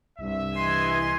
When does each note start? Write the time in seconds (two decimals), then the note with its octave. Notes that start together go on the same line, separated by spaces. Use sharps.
0.19 C2 G2 E5
0.56 E3 D#5 G#5 C6